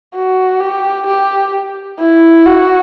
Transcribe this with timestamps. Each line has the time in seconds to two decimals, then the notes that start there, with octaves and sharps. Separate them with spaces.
0.15 F#4
0.61 G4
1.07 G4
2.00 E4
2.46 F#4